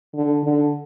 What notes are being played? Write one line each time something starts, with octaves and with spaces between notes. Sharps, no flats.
D3
D3